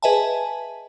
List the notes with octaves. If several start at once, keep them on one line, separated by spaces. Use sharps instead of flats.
G#4 B4 D#5 E5 G#5 A5